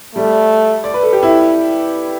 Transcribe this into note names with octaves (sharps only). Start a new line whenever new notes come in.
G3 A3
D5
B4
A4
G4
E4